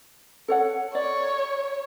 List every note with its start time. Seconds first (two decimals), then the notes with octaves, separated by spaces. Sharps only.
0.48 A4 C#5 F#5
0.95 C#5 D5